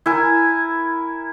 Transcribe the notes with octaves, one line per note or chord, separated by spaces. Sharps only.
E4 A#4 G#5